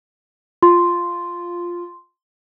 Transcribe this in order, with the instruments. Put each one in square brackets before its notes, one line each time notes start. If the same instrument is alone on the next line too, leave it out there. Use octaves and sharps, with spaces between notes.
[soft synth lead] F4 [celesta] C6